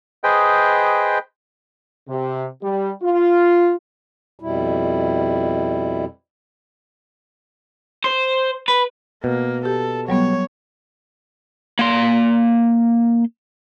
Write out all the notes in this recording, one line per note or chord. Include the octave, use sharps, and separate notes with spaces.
G#4 B4 C5 D#5 G5
C3
G3
F4
F2 B2 G3 E4
C5
B4
B2 A#3
G4 A4
F#3 G3 B3 C#5
A#3 C6